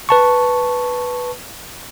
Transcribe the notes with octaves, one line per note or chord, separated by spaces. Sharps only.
B4 A5 C#6